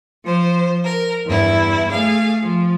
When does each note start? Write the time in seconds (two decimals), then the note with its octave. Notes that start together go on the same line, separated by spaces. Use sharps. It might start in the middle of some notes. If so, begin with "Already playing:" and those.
0.24 F3 C5
0.84 A#4
1.26 E2 G2 E4
1.91 A3 G#4 F5
2.42 F3